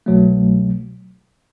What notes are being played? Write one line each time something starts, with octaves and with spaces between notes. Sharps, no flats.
C2 B2 F#3 A3